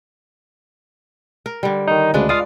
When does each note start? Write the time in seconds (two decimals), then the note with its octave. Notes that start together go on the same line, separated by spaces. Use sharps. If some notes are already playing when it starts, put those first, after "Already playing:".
1.46 A#4
1.63 D3 G3
1.87 D#3 D#4
2.14 D2 C#3 G#3 D4 B4
2.29 F4 D5 F5 D#6